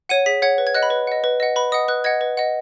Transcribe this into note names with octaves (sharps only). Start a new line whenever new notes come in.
C#5 F#5 D#7
G#4 B6
C#5 F#5 G#6
B4
G#6
D#5 F#5 F#6
B5
B4
D#5 F#5
B4
D#5 F#5
B4 B5
D#5 F#5 D#6
B4 F#6
D#5 F#5 G#6
B4
D#5 F#5